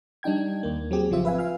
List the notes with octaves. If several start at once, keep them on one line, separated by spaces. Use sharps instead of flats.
G3 D4 D#4 G5 G#6
D#2 A#3
F#3 C4 G4 G#4
G#1 C#3 F3 C4 F4 E5
B4 E5 F5 G#5
F5 F6